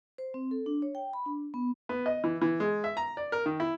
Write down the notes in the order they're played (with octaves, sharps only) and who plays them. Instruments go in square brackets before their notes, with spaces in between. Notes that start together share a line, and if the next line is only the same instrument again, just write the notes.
[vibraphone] C5
C4
A4
D4
C#5
G5
B5
D4
B3
[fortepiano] B3
D#5
E3
E3
G#3
E5
A#5
D5
A#4
D#3
E4